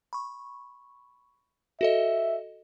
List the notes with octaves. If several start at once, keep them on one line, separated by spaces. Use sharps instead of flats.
B5 C#6
F#4 A4 D#5 E5